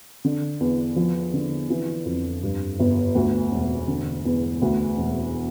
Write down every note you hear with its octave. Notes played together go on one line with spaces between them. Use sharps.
D3
E2
F3
D3
E3
F2
G2
G1
D2
E1
D3
E2
D2
E1